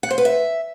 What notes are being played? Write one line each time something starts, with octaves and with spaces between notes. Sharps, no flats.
F#5
C5
B4
E5